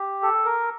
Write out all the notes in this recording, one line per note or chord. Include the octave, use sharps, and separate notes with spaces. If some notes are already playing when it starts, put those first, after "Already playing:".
Already playing: G4
A4
A#4